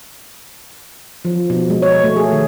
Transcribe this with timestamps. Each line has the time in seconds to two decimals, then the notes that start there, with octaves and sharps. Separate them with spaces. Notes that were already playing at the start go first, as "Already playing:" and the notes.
1.25 F3
1.50 B2
1.70 G#3
1.82 C#5
2.03 A3
2.16 G#4
2.33 D#3